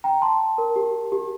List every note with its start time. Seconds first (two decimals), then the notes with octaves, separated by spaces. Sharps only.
0.04 G5 A#5
0.21 A5 C6
0.58 A#4
0.76 G4
1.12 G4